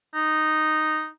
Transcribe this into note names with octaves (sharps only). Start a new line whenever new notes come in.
D#4